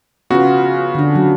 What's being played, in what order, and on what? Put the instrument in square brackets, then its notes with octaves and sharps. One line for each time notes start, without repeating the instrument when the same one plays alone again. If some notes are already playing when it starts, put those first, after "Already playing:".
[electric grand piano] C#3 F#4 [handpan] B3 F4
[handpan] D3 D4
F#3